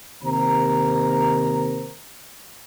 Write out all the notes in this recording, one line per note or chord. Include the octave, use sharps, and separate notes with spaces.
D#2 C3 A#4 C5 A#5